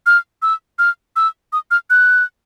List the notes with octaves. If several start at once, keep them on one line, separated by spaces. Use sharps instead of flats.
F6
E6
F6
E6
D#6
F6
F#6